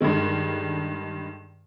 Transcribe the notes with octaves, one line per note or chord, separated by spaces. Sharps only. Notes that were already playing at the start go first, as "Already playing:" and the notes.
G2 D3 D#3 G#3